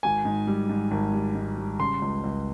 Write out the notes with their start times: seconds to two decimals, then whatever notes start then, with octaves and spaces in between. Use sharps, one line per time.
0.03 G#1 G#5
0.25 G#2
0.47 G3
0.69 G#2
0.91 G#1
1.13 G3
1.35 G#2
1.58 G3
1.79 C#3 C6
2.02 C#2
2.24 C#2